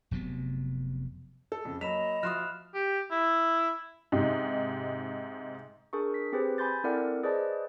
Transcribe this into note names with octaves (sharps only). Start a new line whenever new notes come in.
F1 C3 F#3 B3
A4
F2 C#3
F#3 A#3 D#5 B5 B6 E7 F7
F3 F#4 E5 C6 D#6 F6 F#6 E7
G4
E4
G#2 C3 D#4 G4
D4 G#4 A#4 C#6
B6
C4 G4 G#4 B4 C5
G#5 B5 C6 G6 A6
C4 E4 A4 A#4 D5 F#5
G#4 B4 C5 D5 D#5 A5